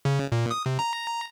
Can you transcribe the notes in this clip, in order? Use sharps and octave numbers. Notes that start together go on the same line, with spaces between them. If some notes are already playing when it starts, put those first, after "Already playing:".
C#3
A#2
D#6
C3
A#5